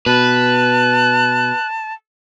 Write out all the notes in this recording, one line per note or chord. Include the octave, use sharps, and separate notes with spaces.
B2 B4 A5 F#6